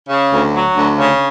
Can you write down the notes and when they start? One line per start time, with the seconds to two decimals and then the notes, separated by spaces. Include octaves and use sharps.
0.09 C#3
0.32 D2
0.54 F#3
0.76 D2
0.98 C#3